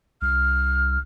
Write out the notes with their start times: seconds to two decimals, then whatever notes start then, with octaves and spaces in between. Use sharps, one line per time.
0.22 C2 F6